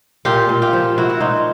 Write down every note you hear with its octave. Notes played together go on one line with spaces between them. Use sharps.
A#2 F4 G4
A#2
F4 G4
F3
F3 E4 F#4
F#4
A#2 D#4 F4